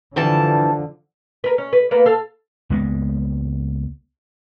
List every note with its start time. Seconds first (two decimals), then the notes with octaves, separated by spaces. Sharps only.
0.16 G2 D3 E3 F3 A5
1.44 A#4 B4
1.58 C#4
1.73 B4
1.91 A#3 B3 B4
2.06 A4 F5
2.70 C#2 G#3 A#3 B3